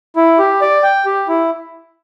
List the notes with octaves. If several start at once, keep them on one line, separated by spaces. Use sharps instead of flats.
E4
G4
D5
G5
G4
E4